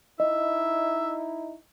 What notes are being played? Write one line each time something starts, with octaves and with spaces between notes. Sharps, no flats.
D#4 E4 D#5 E5